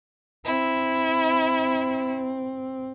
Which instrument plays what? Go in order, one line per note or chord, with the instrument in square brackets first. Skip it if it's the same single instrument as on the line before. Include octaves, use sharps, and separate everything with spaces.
[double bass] C4 [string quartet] E4